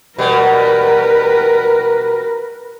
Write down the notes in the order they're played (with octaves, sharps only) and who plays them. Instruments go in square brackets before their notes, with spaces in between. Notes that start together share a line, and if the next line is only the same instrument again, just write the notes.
[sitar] B2 G3 [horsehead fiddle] A#4 B4